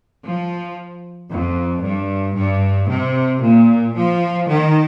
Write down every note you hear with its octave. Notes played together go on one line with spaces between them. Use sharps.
F3
F2
G2
G2
C3
A#2
F3
D#3